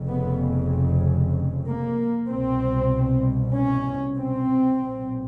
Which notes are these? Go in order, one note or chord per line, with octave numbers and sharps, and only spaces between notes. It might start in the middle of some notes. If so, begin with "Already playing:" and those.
Already playing: F1 F2 C#3
B3
A#3
C2 B2 C4
C#4
C4
B1 A#2